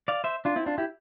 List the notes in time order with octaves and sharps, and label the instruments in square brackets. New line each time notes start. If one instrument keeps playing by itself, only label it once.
[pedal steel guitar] D5 F5
C5 E5
D4 F4
C4 E4
D4 F4
E4 G4